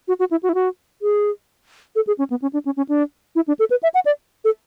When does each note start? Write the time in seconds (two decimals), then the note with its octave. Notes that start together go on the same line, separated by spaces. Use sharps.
0.08 F#4
0.19 F#4
0.31 E4
0.43 F#4
0.49 E4
0.54 F#4
1.02 G#4
1.96 A4
2.07 G#4
2.18 C#4
2.30 B3
2.42 C#4
2.53 D4
2.65 C#4
2.77 C#4
2.89 D4
3.36 E4
3.48 D4
3.59 A4
3.70 B4
3.83 E5
3.94 F#5
4.05 D5
4.45 A4